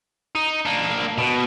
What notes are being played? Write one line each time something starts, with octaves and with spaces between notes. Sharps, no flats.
D#4
A#3 D4
B2